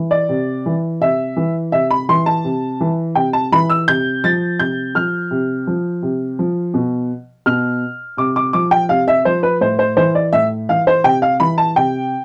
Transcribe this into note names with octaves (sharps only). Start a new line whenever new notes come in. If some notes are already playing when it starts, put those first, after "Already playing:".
Already playing: E3
D5
C3
E3
C3 E5
E3
C3 E5
B5
E3 C6
A5
C3
E3
C3 G5
A5
E3 B5
E6
C3 G6
F3 A6
C3 G6
F3 F6
C3
F3
C3
F3
B2
B2 F6
C3 D6
D6
F3 D6
G5
C3 F5
E5
F3 C5
B4
A2 C5
C5
E3 C5
D5
A2 E5
E3 F5
C5
C3 G5
F5
E3 B5
A5
C3 G5